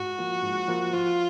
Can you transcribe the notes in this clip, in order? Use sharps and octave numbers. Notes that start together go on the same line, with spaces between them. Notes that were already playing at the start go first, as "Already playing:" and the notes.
Already playing: G#2 F#4
F3 A#3 F4
G#2
F3 A#3 F4
F3 F4